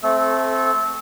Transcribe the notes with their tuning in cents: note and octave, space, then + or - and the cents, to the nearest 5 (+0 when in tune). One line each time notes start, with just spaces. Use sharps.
A3 +0 C4 +5 A4 -20